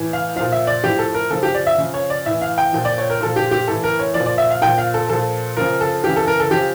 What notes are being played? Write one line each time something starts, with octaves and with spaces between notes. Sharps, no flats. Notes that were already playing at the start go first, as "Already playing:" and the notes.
Already playing: A2 E3
F5
A#2 F3 F5
E5
D5
A2 F3 G4
A4
A#4
C#3 F3 A4
G4
D5
E5
C#3 F3
C#5
D5
A2 E3 E5
F5
G5
A#2 F3
D5
C#5
A#4
A#2 F3 A4
G4
G4
A2 E3 A4
A#4
C#5
A#2 F3 D5
D5
E5
F5
A#2 F3 G5
F5
A4
A#2 F3 A4
C#3 F3 A#4
A4
C#3 E3 G4
A4
A#4
A4
C#3 F3 G4